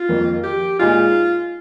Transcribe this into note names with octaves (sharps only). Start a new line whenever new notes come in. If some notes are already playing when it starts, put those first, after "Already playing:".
Already playing: F4
F2 D#3 A#3
G4
A#2 G#3 D#4 F4 G#4